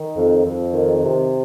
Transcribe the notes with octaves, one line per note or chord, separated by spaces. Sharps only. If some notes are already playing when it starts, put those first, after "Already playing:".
Already playing: D#3
F2
F2
D#3
C3